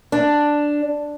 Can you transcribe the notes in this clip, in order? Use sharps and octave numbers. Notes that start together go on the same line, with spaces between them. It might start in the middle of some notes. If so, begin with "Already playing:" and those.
D4